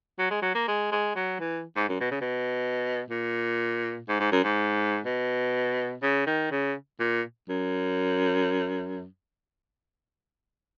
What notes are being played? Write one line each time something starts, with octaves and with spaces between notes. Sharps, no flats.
F#3
G#3
F#3
A#3
G#3
G#3
F#3
E3
G#2
F#2
B2
C#3
B2
A#2
G#2
G#2
F#2
G#2
B2
C#3
D#3
C#3
A#2
F#2